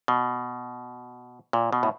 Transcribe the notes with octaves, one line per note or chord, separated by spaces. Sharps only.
B2
A#2
B2
A2